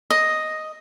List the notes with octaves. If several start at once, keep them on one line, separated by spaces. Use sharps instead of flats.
D#5